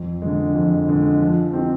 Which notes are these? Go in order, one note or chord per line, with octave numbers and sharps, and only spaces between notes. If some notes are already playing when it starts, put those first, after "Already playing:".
Already playing: F2
D3 G#3
F2
D3 G#3
F3
C4 D#4 G4